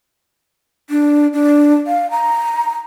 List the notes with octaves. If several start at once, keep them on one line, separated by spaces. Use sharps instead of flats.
D4
D4
F5
A#5